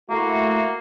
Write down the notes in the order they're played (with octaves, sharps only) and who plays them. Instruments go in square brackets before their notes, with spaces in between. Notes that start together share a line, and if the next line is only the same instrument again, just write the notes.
[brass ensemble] A3 E4 F#4 [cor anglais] A#3